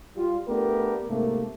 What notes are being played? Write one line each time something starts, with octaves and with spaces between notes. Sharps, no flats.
G3 F4
A3 B3 D4 G4 A#4
G#2 C3 A3 A#3